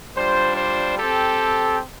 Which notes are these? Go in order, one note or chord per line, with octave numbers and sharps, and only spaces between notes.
G3 D4 F4 C5
C5
C4 G4 A4